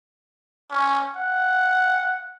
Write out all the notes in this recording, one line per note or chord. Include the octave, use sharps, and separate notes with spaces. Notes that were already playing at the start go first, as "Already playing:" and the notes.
C#4
F#5